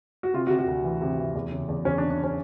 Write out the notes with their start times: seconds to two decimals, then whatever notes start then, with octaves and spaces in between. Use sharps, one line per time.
0.23 F#4
0.34 C3 F4
0.47 F#4
0.50 C3
0.59 F#4
0.67 D2
0.84 E3
1.02 C3
1.18 E3
1.35 E2
1.52 C#3
1.68 E2
1.85 E2 C#4
1.98 D4
2.03 C#3
2.10 D4
2.24 C#4